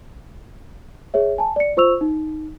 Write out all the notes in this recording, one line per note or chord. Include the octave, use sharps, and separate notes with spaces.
G#4 C#5 E5
G#5 A5
D5 C#7
F4 C5 C#6 E6 F7
D#4